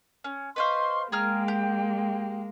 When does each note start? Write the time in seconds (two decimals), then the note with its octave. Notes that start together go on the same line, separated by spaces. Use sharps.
0.24 C#4
0.56 B4 C5 D#5 F5 C6 C#6
1.12 G#3 A#3 G#4 A#4 G5 F6
1.48 G4